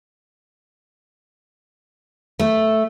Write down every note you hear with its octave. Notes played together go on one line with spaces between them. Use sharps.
A3